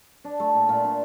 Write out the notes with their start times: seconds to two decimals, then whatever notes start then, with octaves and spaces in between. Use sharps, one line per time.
0.24 D4
0.40 A3
0.55 A#2
0.69 A#2
0.84 D4